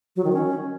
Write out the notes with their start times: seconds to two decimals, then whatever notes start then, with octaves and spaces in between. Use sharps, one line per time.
0.16 F#3
0.24 D#3
0.33 C#4